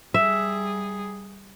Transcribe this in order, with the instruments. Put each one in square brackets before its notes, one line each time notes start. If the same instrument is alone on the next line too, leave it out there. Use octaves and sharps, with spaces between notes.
[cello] G3 G#4 [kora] E5